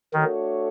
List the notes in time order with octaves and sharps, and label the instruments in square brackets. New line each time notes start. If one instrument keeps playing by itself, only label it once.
[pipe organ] D#3 [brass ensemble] A3 D4 F#4 A4 C#5